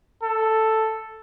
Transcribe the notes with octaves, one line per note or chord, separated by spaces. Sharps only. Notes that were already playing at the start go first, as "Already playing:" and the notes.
A4